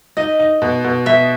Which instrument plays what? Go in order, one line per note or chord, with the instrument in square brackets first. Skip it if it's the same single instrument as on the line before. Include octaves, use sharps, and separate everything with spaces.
[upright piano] D#4 [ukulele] D#5
[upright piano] D#4
B2
B2
[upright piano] B2 [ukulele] E5